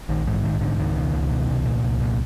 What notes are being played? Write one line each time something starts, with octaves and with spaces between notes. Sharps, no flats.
A#1 D#3
G#2 E3
A#1 D#3
G#2 D3
C#2 D#3
B2
C#2
B2
C2
A#2
C2
A#2